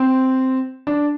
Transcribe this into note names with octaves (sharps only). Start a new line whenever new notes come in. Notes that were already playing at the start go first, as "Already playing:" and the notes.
Already playing: C4
D4